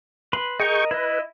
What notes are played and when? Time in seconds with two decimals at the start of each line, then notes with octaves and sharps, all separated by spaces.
0.33 B4 B5 C6
0.60 G#4 A#4 D#5 G5 C#6
0.91 E4 B4 D#5